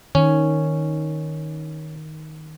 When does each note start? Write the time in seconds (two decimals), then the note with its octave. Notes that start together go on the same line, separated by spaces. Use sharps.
0.15 D#3 C#4